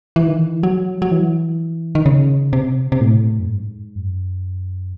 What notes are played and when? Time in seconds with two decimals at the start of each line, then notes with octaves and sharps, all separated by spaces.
0.16 E3
0.27 D#3
0.38 E3
0.63 F#3
1.02 F#3
1.11 E3
1.95 D#3
2.06 C#3
2.53 C3
2.92 C3
3.01 A2
3.39 F#2
3.48 G#2
3.95 F#2